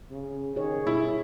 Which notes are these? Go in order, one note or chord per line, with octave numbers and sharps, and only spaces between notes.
C#3
D#3 G#4 C#5
G2 B2 E4